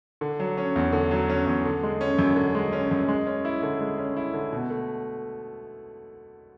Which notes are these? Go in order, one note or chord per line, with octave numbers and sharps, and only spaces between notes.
D3
F#3
C#4
E2
D3
F#3
C#4
E2
D3
G#3
C#4
F#2
D3
G#3
C#4
F#2
G#3
C#4
E4
D3
G#3
C#4
E4
D3
B2
A3